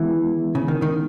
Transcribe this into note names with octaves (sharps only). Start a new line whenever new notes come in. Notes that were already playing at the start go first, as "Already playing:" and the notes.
Already playing: D#3 E3 G#3 B3 E4
C#3
D#3
D#3